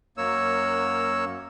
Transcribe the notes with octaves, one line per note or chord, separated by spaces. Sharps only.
F#2 A#3 C#5 E6